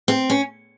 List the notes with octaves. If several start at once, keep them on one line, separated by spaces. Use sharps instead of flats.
C4
C#4